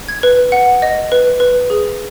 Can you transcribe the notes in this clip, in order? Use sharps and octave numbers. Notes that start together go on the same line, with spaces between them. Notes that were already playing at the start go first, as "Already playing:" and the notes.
G#6
B4
F#5
D#5
B4
B4
G#4